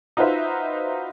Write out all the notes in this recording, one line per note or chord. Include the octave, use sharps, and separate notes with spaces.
D#4 F4 F#4 B4 C5 E5